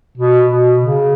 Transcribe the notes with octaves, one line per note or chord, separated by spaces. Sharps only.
B2
B2
C#3